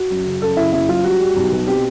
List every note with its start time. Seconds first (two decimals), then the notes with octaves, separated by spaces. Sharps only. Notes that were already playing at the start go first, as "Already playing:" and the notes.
Already playing: F#4
0.10 F#2
0.26 C#3
0.42 F#2 A4
0.57 C#3 E4
0.72 F#1 E4
0.89 F#2 F4
1.04 G3 F#4
1.20 G3
1.37 B1
1.52 B2
1.67 C4 G4